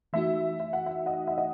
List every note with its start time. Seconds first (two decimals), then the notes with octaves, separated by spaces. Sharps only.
0.13 E3 A3 D#4 F#4 E5
0.60 E5
0.73 F#5
0.86 E5
1.06 D#5 F#5
1.27 E5
1.38 D#5 F#5